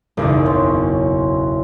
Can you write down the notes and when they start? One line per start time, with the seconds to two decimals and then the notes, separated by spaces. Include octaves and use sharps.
0.17 F#1 B1 E2 D5
0.46 C4 C#4 C#5